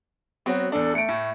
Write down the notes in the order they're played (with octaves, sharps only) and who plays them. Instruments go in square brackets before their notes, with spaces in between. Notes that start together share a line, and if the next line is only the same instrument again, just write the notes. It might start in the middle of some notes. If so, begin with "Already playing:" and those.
[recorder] F#3 [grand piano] B3 C4 F#4
[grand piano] E2 D4 [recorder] A4
[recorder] A3 [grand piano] C#7 D7
[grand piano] A2